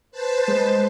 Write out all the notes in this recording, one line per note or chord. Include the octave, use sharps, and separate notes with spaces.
B4 C5 A5
G#3